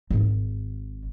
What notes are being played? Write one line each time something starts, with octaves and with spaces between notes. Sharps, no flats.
G#1